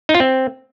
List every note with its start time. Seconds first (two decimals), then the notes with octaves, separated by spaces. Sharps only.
0.09 D#4
0.14 F4
0.20 C4